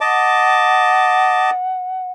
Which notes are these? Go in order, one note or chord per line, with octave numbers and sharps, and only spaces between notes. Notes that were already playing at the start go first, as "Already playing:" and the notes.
D#5 F#5 A5 D6